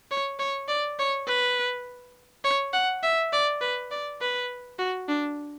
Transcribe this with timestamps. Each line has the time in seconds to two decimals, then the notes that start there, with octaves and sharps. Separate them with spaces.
0.11 C#5
0.39 C#5
0.68 D5
0.99 C#5
1.28 B4
2.44 C#5
2.73 F#5
3.03 E5
3.33 D5
3.61 B4
3.91 D5
4.21 B4
4.79 F#4
5.09 D4